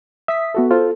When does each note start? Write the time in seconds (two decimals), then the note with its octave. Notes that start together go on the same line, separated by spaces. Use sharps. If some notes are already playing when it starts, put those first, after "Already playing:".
0.28 E5 D#6 B6
0.54 B3 F#4 A4
0.71 F4 A4 C5